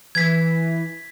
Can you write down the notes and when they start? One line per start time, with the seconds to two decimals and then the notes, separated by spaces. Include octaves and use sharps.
0.15 E3 G#6 B6